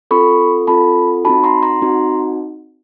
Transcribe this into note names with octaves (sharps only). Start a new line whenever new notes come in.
C4 F4 A4 B5 C#6
C4 F4 A4 A5 B5
C4 D#4 F#4 A5 B5
A#5 C6
A#5 C6
C4 D#4 F#4